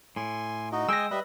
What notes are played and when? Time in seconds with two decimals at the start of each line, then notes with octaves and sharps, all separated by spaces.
0.16 A2 G#5 C6
0.72 D#4 F#4 D#5
0.88 G#3 D#5 G5 G#5 E6 A#6
1.11 G3 B4 D#5 E5